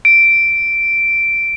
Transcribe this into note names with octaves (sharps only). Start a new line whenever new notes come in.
D7